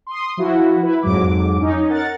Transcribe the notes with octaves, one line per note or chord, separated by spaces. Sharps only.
C6 D#6
F3 E4 F#4
E4 B4
F2 G#2 F#3 D6
C#4 D#4
A#4 F#5 A6